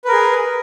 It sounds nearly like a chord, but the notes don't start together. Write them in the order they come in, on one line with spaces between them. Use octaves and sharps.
B4 A#4 G#4